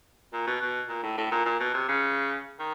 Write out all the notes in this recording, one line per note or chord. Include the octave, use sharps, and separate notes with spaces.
A#2
B2
B2
A#2
A2
A2
A#2
A#2
B2
C3
C#3
D#3